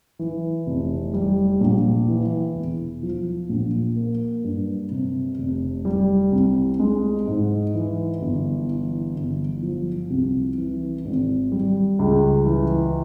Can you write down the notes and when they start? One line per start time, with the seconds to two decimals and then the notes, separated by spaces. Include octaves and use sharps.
0.19 E3
0.66 F1
1.14 G3
1.61 A#1
2.08 E3
2.54 E1
3.03 F3
3.49 A#1
3.96 A#3
4.44 G2
4.91 C3
5.38 F1
5.85 G3
6.32 C2
6.79 G#3
7.27 G#2
7.75 E3
8.22 G1
8.68 E3
9.16 G1
9.62 F3
10.10 C2
10.58 E3
11.05 G#1
11.52 G3
11.99 C#2
12.46 E3